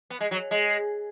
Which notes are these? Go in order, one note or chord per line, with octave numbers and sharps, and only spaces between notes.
B3
G#3
F#3
G#3